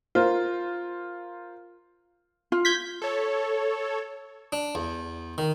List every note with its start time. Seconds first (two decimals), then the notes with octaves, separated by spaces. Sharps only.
0.15 F4 A#4 C5
2.52 F4
2.65 G6 G#6 B6
3.02 A4 C#5
4.52 D4
4.75 E2
5.38 D#3